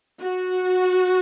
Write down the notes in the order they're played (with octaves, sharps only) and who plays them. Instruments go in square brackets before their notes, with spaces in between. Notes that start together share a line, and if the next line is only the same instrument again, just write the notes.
[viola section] F#4